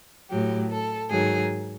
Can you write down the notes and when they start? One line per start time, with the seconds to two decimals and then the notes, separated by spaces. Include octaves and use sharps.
0.30 A2 F#3 G4
0.70 A4
1.10 G#2 D#3 F#3 G#4